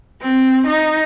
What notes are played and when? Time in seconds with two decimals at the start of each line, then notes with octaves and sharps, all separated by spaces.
0.22 C4
0.66 D#4